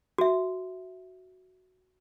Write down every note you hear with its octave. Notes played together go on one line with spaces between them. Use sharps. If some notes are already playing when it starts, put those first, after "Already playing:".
F#4 E5